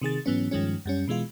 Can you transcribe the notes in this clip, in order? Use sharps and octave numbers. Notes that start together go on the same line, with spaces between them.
C3 D#3 G#4 A6
G#2 E3 F#3 B3 C#4
G2 D#3 F3 G#3 C#4
F#2 G3 C#4
B2 E3 G#3 F4